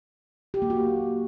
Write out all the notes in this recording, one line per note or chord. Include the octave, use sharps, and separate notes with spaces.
G4
A#3
F#4